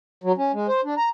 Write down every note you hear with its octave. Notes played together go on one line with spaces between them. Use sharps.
F#3
C#4
G#3
C5
D4
A#5